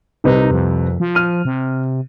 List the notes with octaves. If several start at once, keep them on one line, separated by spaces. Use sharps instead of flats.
C2 C3 D#4 B4
F2
F3
F6 D#7
C3